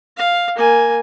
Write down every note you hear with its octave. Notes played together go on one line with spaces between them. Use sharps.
F5
A#3 G#5